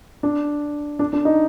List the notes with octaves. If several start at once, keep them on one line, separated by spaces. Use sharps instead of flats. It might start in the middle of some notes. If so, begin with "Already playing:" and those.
D4
D4
D4
D#4